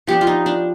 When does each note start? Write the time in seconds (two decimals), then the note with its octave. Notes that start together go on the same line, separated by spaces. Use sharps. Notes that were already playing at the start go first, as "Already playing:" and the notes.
0.07 F3 B3 D4 G4
0.21 F4
0.27 D#4
0.46 D4